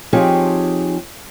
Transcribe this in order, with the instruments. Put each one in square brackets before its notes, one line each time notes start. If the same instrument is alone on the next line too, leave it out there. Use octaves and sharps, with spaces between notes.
[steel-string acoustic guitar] F3 C4 D#4 G4 G#4 C#5